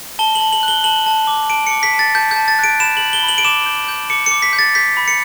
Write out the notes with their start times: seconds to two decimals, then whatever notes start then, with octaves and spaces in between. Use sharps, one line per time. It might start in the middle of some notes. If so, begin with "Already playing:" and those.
0.19 A5 G7
0.35 F#7
0.41 A5
0.53 F#7
0.63 F#6
0.68 G7
0.84 A5 F#7
1.06 A5
1.27 D6
1.50 A5 D7
1.67 D6 C#7
1.83 B6
1.93 A5
1.99 A6
2.15 A5 G6
2.31 A5 G6
2.48 A6
2.59 F#6 D7
2.80 B5 E7
2.97 G6 F#7
3.13 G7
3.23 B5
3.28 F#7
3.38 D7
3.45 D6 E7
3.66 G6
3.88 G6
4.10 D6 C#7
4.26 D6 C#7
4.42 B6
4.53 G6
4.59 A6
4.75 G6 B6
4.97 B5
5.08 C#7